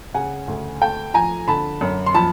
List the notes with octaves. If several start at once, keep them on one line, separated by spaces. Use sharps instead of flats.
C#3 F#5 G#5
D2
A3 G5 A5
F3 G#5 A#5
D3 A5 B5
F#2
C6
F3 A5 B5